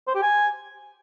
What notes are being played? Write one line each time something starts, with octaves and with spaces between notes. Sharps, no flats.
C5
G4
G#5